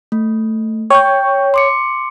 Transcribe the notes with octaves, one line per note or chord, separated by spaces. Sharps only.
A3
C#5 G5 C#6 G6
C6 D6 C#7